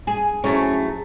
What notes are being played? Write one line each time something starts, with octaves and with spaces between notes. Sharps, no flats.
G#4
A2 F#3 A3 C#4 G#4